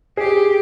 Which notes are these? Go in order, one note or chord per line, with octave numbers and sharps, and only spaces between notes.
G4 G#4